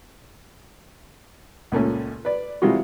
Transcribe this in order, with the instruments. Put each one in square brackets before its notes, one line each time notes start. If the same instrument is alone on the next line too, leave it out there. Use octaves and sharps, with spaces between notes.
[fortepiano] C#2 A#2 A3 C#4
B4 D5
C3 E3 G3 G#3 F4 F#4